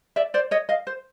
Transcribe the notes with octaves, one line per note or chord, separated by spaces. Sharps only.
D5 E5
C5 D5
C#5 D#5
D#5 F5
C5